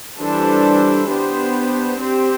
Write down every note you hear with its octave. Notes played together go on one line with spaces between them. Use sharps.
E3 G3 D4 A4 C5
B3 D4 G4 C5
C4 G4 C5